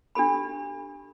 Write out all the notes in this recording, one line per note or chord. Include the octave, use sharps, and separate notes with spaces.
D4 G4 A4 B5